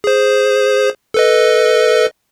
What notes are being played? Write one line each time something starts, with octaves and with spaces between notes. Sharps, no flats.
G#4 C5
A4 B4 D#5